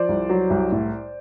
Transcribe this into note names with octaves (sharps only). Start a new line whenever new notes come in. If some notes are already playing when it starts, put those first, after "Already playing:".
Already playing: F3 C5 D5
C2
F#3
C2
A2